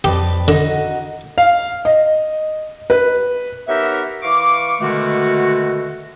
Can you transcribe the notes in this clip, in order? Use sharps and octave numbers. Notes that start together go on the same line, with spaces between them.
F2 G4 B4 D5
D3 D#4 F#4
F5
D#5
B4
B3 D#4 G4 A#4 C#5 E5
E3 F5 C#6 D6
B2 D3 D#3 G#3 A3 F#4